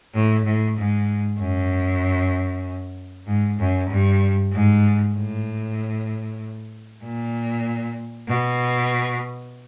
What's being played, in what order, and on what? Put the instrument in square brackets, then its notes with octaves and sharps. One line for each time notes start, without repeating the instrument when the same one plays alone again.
[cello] A2
A2
G#2
F#2
G#2
F#2
G2
G#2
A2
A#2
B2